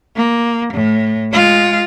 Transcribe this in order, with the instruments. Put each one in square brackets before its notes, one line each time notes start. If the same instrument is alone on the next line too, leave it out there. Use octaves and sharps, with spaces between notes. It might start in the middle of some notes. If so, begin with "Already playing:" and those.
[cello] A#3
A2
G#3 F4